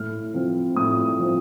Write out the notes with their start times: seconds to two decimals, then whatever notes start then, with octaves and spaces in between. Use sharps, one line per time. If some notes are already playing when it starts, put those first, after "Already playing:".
Already playing: A2 F6
0.34 F3 C4
0.76 A2 D#6
1.19 F3 C4